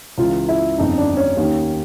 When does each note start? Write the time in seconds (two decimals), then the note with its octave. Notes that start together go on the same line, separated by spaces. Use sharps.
0.18 C#2 C#3 E3 F4
0.49 E4
0.78 G1 F2 C#3 D#4
0.98 D4
1.17 C#4
1.37 D#2 D#3